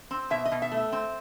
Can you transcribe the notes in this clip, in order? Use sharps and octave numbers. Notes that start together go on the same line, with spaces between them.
C4
B2 E5
D#5
B2
E5
A3
E5
C4